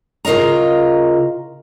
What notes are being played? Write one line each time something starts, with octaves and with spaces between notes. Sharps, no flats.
C#3 F4 A#4 D#5 A#5